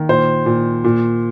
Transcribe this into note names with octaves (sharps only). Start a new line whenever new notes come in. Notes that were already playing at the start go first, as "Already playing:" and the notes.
Already playing: D#3 A#3
A#2 C5
A#2
A#2